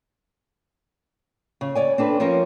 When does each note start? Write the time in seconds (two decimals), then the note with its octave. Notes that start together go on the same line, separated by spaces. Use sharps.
1.61 C#3
1.75 C#5 D5 G#5
1.98 C4 D4 A4 B4
2.20 F3 C4 C#4 A#4